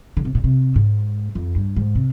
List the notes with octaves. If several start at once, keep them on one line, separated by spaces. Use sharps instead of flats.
D3
C3
A#2
C3
G#2
F2
G2
G#2
C3